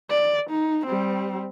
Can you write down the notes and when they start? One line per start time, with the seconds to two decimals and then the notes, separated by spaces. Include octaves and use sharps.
0.10 D5
0.50 D#4
0.86 G3 C4